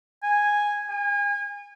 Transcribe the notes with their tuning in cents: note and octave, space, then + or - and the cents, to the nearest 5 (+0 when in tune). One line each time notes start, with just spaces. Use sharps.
G#5 -5
G#5 -35